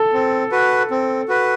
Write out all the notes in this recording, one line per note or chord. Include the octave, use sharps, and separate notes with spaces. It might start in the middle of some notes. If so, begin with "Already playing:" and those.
Already playing: A4
C4
F#4 B4
C4
F#4 B4